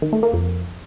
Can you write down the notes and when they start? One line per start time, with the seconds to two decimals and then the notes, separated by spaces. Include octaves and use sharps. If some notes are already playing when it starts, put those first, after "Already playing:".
0.02 D#3
0.13 A3
0.23 A#3
0.33 F2